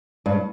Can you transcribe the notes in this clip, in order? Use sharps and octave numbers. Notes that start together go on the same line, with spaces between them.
G2